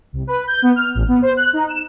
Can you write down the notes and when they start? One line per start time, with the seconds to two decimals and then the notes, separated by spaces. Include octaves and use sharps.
0.13 C2
0.27 B4
0.47 G6
0.62 B3
0.76 F6
0.94 A1
1.08 B3
1.22 C5
1.37 F#6
1.53 D#4
1.69 E7